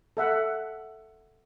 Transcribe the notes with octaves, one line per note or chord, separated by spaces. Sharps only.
A4 E5 F#5